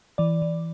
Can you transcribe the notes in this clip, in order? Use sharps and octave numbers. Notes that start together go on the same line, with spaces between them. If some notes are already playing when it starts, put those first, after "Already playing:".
E3 D5
E3